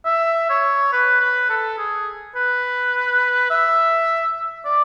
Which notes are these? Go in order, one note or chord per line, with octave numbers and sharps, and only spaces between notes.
E5
C#5
B4
B4
A4
G#4
B4
E5
D5